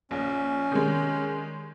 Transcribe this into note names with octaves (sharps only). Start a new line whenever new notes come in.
A#1 C#4
D#3 G3 G#3